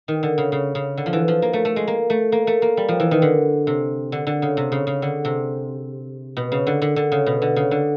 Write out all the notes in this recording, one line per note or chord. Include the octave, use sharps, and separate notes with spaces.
D#3
D3
C#3
C#3
C#3
D3
F3
E3
F3
A#3
A3
A3
G#3
A#3
A3
A#3
A3
A#3
G3
F3
E3
D#3
D3
C3
D3
D3
C#3
C3
C#3
C#3
D3
C3
B2
C#3
D3
D3
D3
C#3
B2
D3
C#3
D3